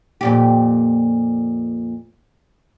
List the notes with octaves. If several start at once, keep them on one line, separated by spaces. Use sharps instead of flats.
F2 A#2 G4